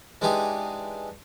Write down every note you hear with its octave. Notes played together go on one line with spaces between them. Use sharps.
E3 G#3 D4 D#4 G4 G#4